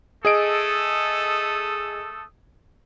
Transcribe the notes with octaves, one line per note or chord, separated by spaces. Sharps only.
A3 G#4 A4 D#5 D#6 D7